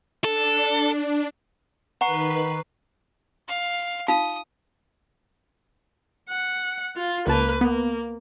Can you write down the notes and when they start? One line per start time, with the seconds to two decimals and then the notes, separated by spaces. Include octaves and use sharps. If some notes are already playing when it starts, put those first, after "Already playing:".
0.24 D4 A4
2.01 D#3 B4 F#5 A#5 C#6 C7
3.48 F5
4.08 D#4 F4 F5 D#6
6.29 F#5
6.97 F4
7.27 C#2 A#3 B4 A5
7.61 A#3 B3